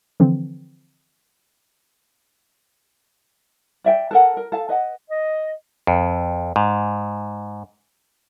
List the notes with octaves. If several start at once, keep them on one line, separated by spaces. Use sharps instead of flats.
D3 E3 F3 C4
D5 E5 G5
A4 A#4 F#5
A#4
A4 F5 A5
B4 D#5 F#5
D#5
F2
G#2